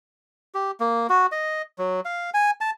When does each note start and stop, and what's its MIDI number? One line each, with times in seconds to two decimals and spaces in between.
0.54 0.71 67
0.80 1.07 58
1.09 1.26 66
1.32 1.62 75
1.78 2.00 54
2.05 2.30 77
2.34 2.51 80
2.61 2.71 81